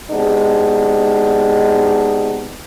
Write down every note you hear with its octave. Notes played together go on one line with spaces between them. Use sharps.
C3 G#3 B3 D4 D#4